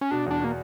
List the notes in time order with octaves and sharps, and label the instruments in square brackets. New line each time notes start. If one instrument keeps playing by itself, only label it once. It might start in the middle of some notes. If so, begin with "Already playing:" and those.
[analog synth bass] C#4
[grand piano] B2 [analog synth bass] D4
[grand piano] E2 [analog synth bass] D4
[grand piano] B2 [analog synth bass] A#3